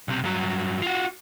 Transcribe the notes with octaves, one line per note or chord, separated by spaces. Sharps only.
B1 C3
G2 F#3
F4 F#4